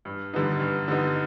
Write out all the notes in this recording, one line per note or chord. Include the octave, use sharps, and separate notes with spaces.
G2
D3 G3 B3 D#4
G2
D3 G3 B3 D#4